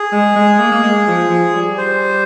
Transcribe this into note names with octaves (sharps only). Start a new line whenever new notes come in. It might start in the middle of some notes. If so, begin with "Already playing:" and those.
Already playing: G#4
G#3
G#3
A#3
A#3
G#3
F3
F3
G3
C5